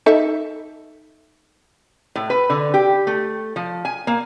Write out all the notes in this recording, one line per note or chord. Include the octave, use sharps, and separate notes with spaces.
D#4 A4 E5
A2
B4
D3
G4
A3
F3
G#5
A#3